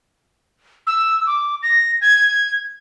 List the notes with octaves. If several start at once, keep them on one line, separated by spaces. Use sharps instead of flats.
E6
D6
A#6
G#6